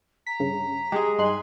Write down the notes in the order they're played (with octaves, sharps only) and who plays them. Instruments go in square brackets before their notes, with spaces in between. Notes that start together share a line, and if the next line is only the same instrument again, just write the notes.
[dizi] A#5 [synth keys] B6
[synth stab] G2 C#3
[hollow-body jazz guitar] G#3 G#4 [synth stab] G4
[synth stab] G2 D#4 F#6 [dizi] G#5 [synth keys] C6